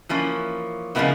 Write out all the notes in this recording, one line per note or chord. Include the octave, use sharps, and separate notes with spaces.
E3 F3 A#3 C#4
C#3 F3 G#3 A#3 B3 E4